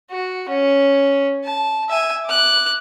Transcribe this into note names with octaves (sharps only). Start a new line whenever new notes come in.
F#4
C#4
A5
E5 G#5
D6 F#6